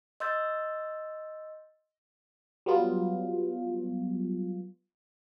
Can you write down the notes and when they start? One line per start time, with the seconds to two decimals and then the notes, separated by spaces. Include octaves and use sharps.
0.20 D#5 C6 E6 G6 A6
2.66 F#3 G3 B3 F4